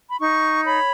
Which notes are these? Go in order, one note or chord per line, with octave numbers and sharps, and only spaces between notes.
B5
D#4 C#6
C#5 B5